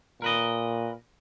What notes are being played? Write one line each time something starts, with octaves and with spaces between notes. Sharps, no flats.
A#2 A#4 B4 D#5